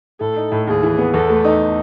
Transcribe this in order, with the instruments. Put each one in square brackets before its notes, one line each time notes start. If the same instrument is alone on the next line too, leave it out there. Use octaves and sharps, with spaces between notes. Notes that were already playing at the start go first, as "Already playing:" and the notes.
[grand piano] A2 [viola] A4
[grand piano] D#4
A2
[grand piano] D#2 [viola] G#4
[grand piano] E3
B3
[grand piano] E2 [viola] A4
[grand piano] A3
D#4